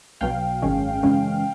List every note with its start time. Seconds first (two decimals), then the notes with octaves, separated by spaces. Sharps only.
0.21 B1 B2 F#3 F5 G5
0.62 G#1 F#2 D#3 G#3 C#4
1.03 F#2 C#3 E3 G#3 C#4